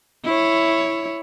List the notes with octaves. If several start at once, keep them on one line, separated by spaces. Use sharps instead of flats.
E4 C#5